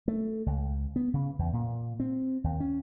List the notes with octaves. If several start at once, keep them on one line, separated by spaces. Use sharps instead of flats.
A3
C#2
B3
C#3
E2
A#2
C4
D#2
C#4